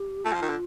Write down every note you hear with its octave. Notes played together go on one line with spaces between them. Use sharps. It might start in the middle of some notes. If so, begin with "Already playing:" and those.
Already playing: G4
A3 F4
F3
D#3
D3